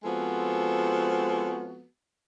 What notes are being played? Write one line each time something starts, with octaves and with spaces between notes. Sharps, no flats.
F3 G#3 B3 C4 F#4 A4